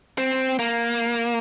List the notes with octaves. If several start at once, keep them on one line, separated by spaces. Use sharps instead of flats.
C4
A#3